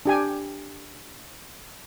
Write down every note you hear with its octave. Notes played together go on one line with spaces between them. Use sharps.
D4 G4 G#5